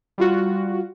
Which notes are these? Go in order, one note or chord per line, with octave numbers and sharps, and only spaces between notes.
G3 F4 F#4